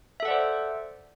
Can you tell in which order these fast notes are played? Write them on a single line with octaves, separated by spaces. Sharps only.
E5 A4 F#5 D5 C5